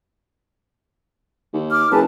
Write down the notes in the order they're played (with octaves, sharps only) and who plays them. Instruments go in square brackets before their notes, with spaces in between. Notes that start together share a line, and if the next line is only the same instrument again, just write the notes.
[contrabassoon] D#2
[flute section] D6 F6
[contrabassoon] F#1 [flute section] G#4 B4 A5